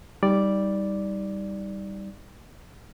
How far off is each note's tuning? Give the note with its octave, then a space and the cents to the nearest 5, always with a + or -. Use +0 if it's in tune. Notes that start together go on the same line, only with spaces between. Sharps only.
G3 +0 D#4 +15 D5 +0